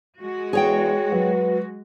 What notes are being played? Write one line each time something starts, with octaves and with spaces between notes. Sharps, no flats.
G#3 F#4
E2 G#4 C#5 G5
F#3 B4